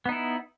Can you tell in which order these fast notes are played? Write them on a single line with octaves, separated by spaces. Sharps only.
B3 D#4 E4